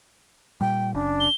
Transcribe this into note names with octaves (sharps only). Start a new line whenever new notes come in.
A#2 G3 G5
F#1 C#3 D4
G7